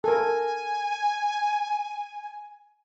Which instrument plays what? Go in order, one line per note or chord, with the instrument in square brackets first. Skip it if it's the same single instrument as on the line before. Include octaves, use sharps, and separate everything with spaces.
[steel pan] A4 A#4 [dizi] G#5